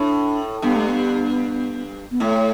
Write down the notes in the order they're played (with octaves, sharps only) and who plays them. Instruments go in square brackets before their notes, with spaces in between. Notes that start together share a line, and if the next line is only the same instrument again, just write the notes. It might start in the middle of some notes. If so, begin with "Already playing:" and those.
Already playing: [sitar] A2 [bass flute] D4
[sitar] G2 [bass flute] B3
[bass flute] A3
B3
B3
[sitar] A2 [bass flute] A3